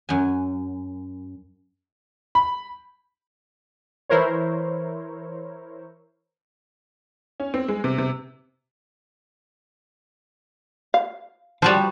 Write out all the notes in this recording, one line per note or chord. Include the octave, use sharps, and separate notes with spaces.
F#2 G#5
B5
E3 E4 A#4 C5 C#5
C#4
C4
G#3
C3
C3
F5
F3 G3 F#4 C5 D5